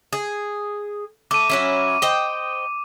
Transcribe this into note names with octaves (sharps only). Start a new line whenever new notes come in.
G#4
A3 D6 D#7
F#3 C#4 E4
C5 D#5 G5